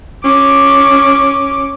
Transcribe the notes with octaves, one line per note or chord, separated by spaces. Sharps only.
C#4 D6